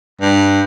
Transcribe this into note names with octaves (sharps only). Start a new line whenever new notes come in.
G2